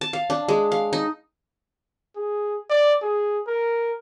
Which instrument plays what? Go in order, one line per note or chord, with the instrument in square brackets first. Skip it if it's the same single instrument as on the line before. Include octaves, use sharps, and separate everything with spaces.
[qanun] A5
F5
D4
G#3
F5
D#4
[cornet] G#4
D5
G#4
A#4